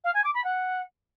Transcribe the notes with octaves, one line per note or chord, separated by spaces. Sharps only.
F5
G#5
D6
B5
F#5